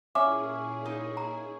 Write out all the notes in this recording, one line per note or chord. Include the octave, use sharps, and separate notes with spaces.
A#2 C#4 E4 G#4 E5 D6
D#4
A#5